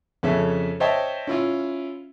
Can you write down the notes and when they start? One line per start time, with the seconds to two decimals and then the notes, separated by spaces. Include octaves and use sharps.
0.23 F2 C#3 C#4 A4 E5
0.80 C5 C#5 D#5 E5 G5 A5
1.27 C#4 E4 F4